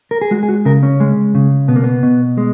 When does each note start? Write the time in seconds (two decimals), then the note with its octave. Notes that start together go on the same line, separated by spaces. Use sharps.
0.11 A#4
0.21 G#4
0.31 G#3 F#4
0.43 G#4
0.49 F#4
0.65 C#3 A#4
0.83 C#4
1.00 G#3
1.35 C#3
1.68 B2 B3
1.76 A#3
1.84 B3
2.03 B2
2.38 G#3